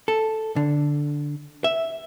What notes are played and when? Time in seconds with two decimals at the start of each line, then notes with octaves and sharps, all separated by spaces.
0.08 A4
0.56 D3
1.64 E5